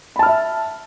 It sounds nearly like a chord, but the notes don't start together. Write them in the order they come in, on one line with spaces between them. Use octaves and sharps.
B5 A5 F6 E5